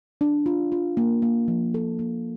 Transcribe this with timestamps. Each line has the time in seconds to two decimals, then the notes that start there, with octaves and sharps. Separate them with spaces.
0.21 D4
0.46 F4
0.72 F4
0.97 A#3
1.22 A#3
1.48 F3
1.74 A4
1.99 A#3